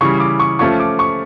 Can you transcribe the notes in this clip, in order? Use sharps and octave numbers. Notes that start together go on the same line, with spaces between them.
C#3 E3 G3 C#6
D6
C#6
F3 A3 C#4 F4 C#6
D6
C#6